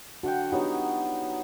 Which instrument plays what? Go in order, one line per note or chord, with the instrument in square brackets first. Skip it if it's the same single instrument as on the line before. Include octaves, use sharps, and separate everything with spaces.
[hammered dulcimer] D3 F#5 G5 [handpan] F#4
[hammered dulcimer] F#3 B3 D#4 [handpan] F4 G4 C#5